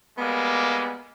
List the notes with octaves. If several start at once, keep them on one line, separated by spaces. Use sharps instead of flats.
G3 G#3 A#3 B3